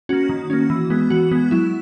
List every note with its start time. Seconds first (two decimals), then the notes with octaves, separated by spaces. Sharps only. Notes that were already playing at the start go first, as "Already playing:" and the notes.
0.09 A#3 C#4 F#4
0.29 D#3
0.50 A#3 C#4
0.70 E3
0.90 G#3 B3
1.10 E3 F#4
1.31 G#3 B3
1.51 F#3 E4